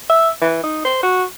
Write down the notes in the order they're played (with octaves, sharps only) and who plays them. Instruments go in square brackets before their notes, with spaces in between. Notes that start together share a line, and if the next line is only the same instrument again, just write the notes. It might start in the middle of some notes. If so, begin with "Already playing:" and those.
[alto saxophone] E5
E3
D#4
C5
F#4